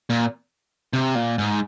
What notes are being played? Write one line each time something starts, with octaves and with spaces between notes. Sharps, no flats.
A#2
C3
A#2
G#2